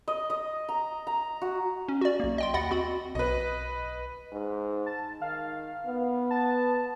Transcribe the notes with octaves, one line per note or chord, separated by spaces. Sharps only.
D#5
D#5
A#5
A#5
F#4
C#4
F#4 D5
B1 A#3
D#5 G5 C6
D#2 D#5 F#5 B5 A6
C4 F#4 B5
B1 B4 D#5
G#2
A5
D#3 F5
B3
A5